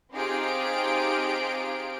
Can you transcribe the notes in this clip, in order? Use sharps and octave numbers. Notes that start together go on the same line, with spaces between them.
C4 D#4 F4 G4 G#4 D7